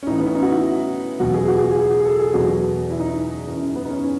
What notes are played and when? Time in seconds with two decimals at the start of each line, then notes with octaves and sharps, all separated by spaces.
0.03 C#4
0.07 A2 E3 D#4
0.18 B3
0.27 C#4
0.35 D#4
0.42 F#4
0.49 E4
1.20 E2 B2 F#3 F#4
1.34 G#4
1.48 F#4
1.56 G#4
1.63 F#4
1.70 G#4
1.79 F#4
2.00 G#4
2.05 A4
2.19 G#4
2.33 E2 B2 F#3 F#4
2.90 E4
3.00 D#4
3.47 F#2 E3
3.75 B3
3.85 D#4
3.90 C#4
4.04 C#4